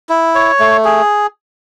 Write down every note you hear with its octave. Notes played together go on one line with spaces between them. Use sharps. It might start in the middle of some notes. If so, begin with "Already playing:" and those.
E4
C#5
A3
G#4